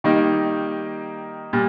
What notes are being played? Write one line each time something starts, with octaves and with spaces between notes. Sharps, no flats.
D#3 G3 A#3 D#4
A#2 G3